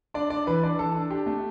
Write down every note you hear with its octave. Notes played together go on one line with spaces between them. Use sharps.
D4 D5
D4 D5
E3 B4
D4 D5
E3 A4
D4
D4 G4
A3